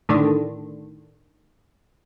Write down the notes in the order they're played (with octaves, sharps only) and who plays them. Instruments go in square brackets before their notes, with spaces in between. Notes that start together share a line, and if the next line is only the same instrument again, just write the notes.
[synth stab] A2 D3 D#3 D4